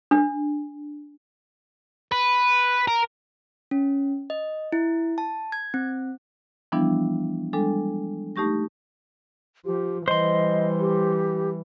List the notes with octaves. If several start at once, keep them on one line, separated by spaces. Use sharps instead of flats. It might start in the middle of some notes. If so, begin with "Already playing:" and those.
D4
B4
A#4
C#4
D#5
E4
A5
G#6
C4
E3 F3 G3 B3 D4 E4
G3 G#3 D4 A4
A3 D#4 G4 C#6 A#6
F3 G4
E3 G3 C5 D#5 C6
G4